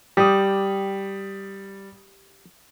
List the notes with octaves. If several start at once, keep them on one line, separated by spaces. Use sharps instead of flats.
G3 G4 D#6